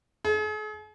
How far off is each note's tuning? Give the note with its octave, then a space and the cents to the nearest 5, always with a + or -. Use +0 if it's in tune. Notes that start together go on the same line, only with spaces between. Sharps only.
G#4 +45